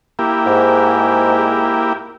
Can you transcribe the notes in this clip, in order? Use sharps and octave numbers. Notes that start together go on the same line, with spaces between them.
A#3 E4 G4
G#2